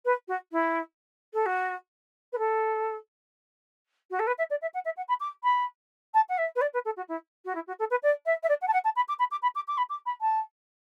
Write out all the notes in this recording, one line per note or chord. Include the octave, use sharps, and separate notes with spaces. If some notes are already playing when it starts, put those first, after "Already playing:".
B4
F#4
E4
A4
F#4
B4
A4
F#4
A4
B4
E5
D5
E5
F#5
E5
F#5
B5
D6
B5
A5
F#5
E5
B4
D5
B4
A4
F#4
E4
F#4
E4
F#4
A4
B4
D5
E5
E5
D5
F#5
A5
F#5
A5
B5
D6
B5
D6
B5
D6
D6
B5
D6
B5
A5